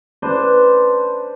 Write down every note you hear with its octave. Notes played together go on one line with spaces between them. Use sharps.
D4 B4 C5